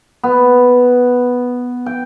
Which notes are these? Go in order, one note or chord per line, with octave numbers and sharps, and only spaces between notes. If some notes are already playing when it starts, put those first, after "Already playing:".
B3
G5